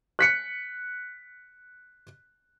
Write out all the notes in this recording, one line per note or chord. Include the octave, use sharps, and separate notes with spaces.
F#6 B6 C#7